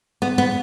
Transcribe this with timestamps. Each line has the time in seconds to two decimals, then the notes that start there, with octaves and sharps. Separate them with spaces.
0.22 B3
0.38 B3